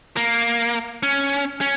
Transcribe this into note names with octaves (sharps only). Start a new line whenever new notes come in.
A#3
C#4
C#4